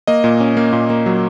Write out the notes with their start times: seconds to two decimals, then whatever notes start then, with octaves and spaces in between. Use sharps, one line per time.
0.07 A#3 D#5
0.24 A#2
0.40 C#4
0.57 A#3
0.73 A#2
0.90 A#3
1.06 F#3